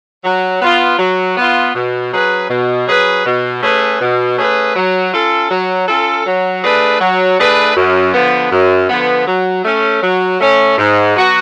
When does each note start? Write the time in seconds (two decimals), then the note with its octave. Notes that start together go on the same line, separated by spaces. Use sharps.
0.24 F#3
0.61 B3 F4
0.99 F#3
1.37 B3 F4
1.75 B2
2.13 F#3 C#4 G#4 B4
2.50 B2
2.88 F#3 C#4 G#4 B4
3.26 B2
3.62 A3 C#4 G#4 B4
4.01 B2
4.38 A3 C#4 G#4 B4
4.76 F#3
5.13 C#4 F4 A4
5.51 F#3
5.88 C#4 F4 A4
6.26 F#3
6.64 A3 D4 G#4 B4
7.01 F#3
7.38 A3 D4 G#4 B4
7.76 F#2
8.14 D3 F3 B3
8.52 F#2
8.89 D3 F3 B3
9.27 F#3
9.65 A3 C#4
10.03 F#3
10.40 A3 C#4
10.78 G#2
11.15 F#3 B3 F#4 B4